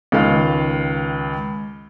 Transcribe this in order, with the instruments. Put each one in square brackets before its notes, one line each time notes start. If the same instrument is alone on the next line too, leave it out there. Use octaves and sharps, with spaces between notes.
[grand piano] C#2 D#3 F5